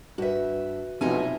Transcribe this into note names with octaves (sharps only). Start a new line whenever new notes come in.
G2 F#4 B4 E5
B1 C3 F3 D#4 E5 G#5